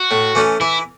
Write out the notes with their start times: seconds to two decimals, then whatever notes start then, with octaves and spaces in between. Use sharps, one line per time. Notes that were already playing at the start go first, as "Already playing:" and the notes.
Already playing: F#4
0.11 A2
0.35 E3 A3 C#4
0.60 E3 E4